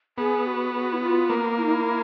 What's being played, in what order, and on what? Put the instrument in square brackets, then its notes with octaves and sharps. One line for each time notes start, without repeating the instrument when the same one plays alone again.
[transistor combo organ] B3 [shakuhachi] G#4
[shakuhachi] F#4
F#4
E4
F4
[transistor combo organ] A#3
[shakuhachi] E4
D#4
E4